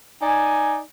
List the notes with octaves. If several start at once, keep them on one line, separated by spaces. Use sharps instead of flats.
D#4 D5 G#5